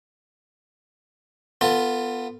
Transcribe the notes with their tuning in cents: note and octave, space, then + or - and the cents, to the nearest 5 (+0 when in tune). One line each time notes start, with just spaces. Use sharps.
B3 +0 F4 +0 A4 +25